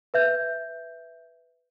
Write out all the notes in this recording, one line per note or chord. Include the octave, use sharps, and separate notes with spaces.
B4 E5 G6